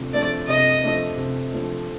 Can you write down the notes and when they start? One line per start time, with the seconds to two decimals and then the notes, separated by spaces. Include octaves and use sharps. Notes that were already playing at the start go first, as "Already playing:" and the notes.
Already playing: C3 F3 A3 D4
0.13 F3 A3 D4 D5
0.48 C3 D#5
0.82 F3 A3 D4
1.17 C3
1.52 F3 A3 D4